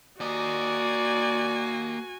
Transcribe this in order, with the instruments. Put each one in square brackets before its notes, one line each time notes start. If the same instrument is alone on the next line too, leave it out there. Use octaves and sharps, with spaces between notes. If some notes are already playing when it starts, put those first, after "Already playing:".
[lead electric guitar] A#3 D#5 [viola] F#4 G#5 [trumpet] D5